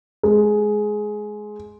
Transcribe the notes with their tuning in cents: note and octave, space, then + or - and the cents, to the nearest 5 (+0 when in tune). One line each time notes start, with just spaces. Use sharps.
G#3 +15